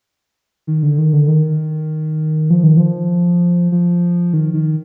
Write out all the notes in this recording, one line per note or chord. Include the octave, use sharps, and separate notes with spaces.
D#3
D3
D#3
D3
D#3
F3
D#3
F3
F3
D#3
D#3